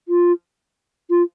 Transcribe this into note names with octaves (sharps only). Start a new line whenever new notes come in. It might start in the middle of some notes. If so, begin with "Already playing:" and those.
F4
F4